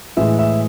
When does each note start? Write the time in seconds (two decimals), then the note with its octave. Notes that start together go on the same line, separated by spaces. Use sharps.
0.17 A2 E3 G#3 E5
0.39 E5